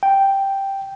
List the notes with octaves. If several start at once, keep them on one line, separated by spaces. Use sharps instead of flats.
G5